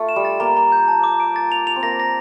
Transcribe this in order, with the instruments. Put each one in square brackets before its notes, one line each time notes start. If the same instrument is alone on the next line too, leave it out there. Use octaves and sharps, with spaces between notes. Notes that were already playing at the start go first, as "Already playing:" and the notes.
Already playing: [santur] A3 F4
[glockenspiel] E7
[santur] G3
[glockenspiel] A6
[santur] A#3 [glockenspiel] A#5
[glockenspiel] A#5
G6
A5
D6
D7
A6
F7
F7
[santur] C4
[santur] A#3 [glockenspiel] A#6
[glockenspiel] A#6